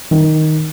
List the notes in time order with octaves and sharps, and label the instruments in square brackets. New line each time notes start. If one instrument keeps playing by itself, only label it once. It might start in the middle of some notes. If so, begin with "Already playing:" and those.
[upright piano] D#3